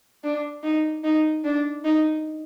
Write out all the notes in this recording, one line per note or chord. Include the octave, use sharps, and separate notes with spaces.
D4
D#4
D#4
D4
D#4